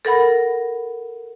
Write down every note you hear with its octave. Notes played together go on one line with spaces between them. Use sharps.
A4 A#4 F#5 B5